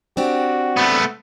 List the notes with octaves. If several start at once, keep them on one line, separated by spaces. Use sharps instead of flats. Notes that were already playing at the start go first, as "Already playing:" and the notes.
C4 D4 F#4 G4
A3 B3